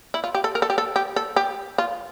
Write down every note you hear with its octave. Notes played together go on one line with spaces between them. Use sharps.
E4
F4
G4
A4
A#4
A4
G4
A4
G4
A4
G4
F4